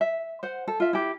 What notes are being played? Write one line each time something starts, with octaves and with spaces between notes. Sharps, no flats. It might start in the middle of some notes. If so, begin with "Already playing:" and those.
E5
C5 F#5
A4
F4 E5
E4 G4